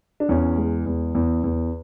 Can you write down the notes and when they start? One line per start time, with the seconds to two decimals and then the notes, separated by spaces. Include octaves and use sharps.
0.20 D4
0.29 E2 C#4
0.57 G#3
0.86 E2
1.15 E2
1.44 E2